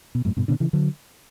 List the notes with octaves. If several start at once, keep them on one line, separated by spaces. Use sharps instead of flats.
B2
F#2 A2
G2 B2
B2 D3
C#3 E3
D3 F#3